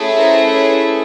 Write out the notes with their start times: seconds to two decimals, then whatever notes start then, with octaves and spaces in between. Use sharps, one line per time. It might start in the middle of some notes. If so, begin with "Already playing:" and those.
Already playing: A3 C#4 E4 G#4
0.17 A#4 C5
0.54 B4 C#5